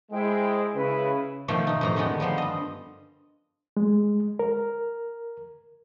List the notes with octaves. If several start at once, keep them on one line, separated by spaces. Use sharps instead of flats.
G#3 E4 C5 G5
C#3 E4 B4
B2 D#3 F3 A3
G2 D#4
F2 A2 A#5
D3 D#3 G#3 B3
F3 G3 B3 C5
G2 D#5
G#3
A#4